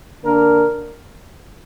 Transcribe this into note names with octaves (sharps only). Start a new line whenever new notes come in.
D3 A#3 D4 A#4